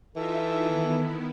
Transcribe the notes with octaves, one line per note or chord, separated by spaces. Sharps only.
E3 D#4 F4 A4 E5
D#3 B3 E4